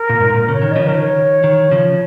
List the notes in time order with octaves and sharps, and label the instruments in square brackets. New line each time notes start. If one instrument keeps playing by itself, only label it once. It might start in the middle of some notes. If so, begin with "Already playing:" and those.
Already playing: [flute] A#4
[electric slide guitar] A#2
G#2
[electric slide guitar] A#2 [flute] A#4
[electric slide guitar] C#3 [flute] C#5
[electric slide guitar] D#3
[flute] D#5
[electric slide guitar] C#3 F3 [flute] C#5
[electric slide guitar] D#3 [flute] A#4
[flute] C#5
[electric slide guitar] D#3
C#3 F3